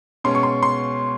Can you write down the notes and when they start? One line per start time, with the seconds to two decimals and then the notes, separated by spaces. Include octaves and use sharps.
0.24 B2 G#3 C#4 C6
0.35 C#6
0.43 C6
0.63 C6